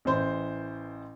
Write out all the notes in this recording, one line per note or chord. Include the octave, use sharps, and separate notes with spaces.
A1 E3 C5 C6